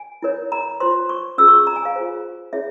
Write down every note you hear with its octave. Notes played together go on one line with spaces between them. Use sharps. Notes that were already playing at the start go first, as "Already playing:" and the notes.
Already playing: G#5
E4 A#4 C#5
A#5
F4 C5 C6
C#6
C#4 F4 G#4 E6
C#6
A#5
G#5
F5
F4 G#4 C5
C#4 E4 G#4 C#5 E5